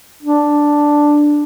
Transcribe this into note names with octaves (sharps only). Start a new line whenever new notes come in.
D4